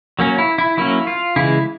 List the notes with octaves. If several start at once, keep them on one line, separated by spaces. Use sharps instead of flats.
F#3 A#3 C#4
E4
E4
F#3 A#3 C#4 E4
F4
C#3 E3 G#3 E4